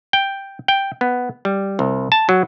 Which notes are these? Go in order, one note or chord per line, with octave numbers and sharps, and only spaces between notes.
G5
G5
B3
G3
C2
A5
F#3